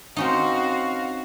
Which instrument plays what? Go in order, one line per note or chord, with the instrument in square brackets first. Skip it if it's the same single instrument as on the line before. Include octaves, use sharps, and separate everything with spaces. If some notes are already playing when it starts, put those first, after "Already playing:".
[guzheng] C4 C#4 D#4 [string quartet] F#4 F5